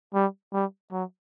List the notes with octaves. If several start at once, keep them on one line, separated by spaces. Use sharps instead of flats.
G3
G3
F#3